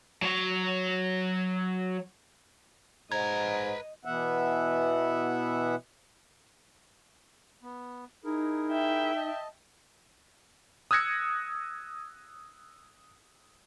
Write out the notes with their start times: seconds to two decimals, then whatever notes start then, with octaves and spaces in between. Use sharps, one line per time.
0.22 F#3 C#5
3.12 G#2 B4 D#5 A#5 G#6
4.05 B2 E3 B3 E5 F#5
7.63 B3
8.25 D#4 E4 G#4 A#4
8.72 E5 G5
9.16 D#5 A5
10.91 D#6 E6 F#6 G#6 A#6 C#7